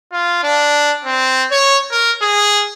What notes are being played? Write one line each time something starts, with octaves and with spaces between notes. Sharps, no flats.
F4
D4
C4
C#5
A#4
G#4